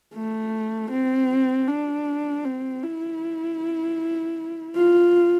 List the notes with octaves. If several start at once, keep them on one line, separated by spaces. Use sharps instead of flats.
A3
C4
D4
C4
E4
F4